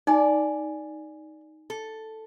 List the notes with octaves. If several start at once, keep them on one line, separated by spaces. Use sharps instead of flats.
D#4 D5 G#5
A4